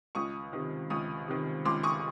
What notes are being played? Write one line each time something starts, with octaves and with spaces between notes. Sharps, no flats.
C#2 C#6 D#6
C3 D#3
C#2 C#6 D#6
C3 D#3
C#2 C6 D6
C#6 D#6